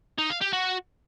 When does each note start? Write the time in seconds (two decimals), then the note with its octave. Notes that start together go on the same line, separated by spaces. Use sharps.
0.19 D#4
0.30 F5
0.41 G4
0.53 F#4